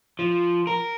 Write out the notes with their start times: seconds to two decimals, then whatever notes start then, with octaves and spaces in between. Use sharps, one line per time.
0.19 F3
0.67 A#4